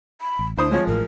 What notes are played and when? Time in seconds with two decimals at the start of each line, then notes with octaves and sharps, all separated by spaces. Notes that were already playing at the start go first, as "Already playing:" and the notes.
0.21 B5
0.39 A1
0.57 D2 D4 E4 C5 D#6
0.71 F3 G#3 C#5
0.87 A1 A2 E3 A#4